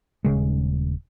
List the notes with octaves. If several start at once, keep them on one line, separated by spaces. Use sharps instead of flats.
D#1 C#3 G#3